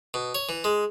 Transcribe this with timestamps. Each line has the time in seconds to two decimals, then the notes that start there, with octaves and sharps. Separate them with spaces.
0.14 B2
0.35 C#5
0.49 E3
0.64 G#3